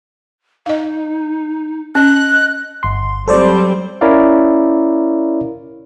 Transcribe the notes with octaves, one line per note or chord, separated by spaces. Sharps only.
D#4 D#5 F5
C#4 D#5 F#6
G1 C6
F#3 G3 C4 A4 C5 D5
C#4 E4 A#4 C#5 D5 F5